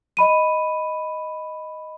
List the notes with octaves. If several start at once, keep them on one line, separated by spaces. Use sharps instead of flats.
D#5 B5 D#7